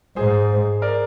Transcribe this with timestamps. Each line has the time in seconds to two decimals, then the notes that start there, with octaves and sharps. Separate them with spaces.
0.16 G#2 G#4 C5
0.82 A#4 D5